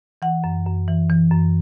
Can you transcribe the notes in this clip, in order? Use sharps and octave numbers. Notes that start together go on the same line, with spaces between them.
E3 F#5
F#2
F#2
E3
E3
F#2